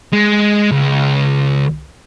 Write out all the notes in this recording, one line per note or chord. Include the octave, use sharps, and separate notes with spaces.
G#3
C#2